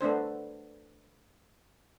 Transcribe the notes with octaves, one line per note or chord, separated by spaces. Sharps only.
A3 B3 D4 C5